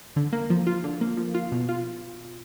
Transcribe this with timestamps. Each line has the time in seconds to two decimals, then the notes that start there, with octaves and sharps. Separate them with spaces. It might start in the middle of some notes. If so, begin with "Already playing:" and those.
0.16 D3
0.33 A#3
0.50 F3
0.67 F4
0.84 D3
1.01 A#3
1.17 F3
1.34 F4
1.52 B2
1.69 F4